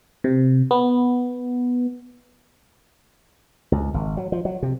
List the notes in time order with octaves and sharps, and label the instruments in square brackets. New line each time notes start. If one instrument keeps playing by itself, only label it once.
[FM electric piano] C3
B3
[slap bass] C#2
G#1
F#3
F3
F#3
C3